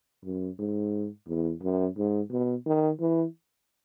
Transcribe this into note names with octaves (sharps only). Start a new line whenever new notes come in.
F#2
G#2
E2
F#2
G#2
B2
D#3
E3